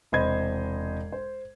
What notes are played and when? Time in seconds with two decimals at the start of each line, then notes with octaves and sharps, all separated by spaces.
0.12 E1 C3 C5 D#5 B5 G#6
1.12 C5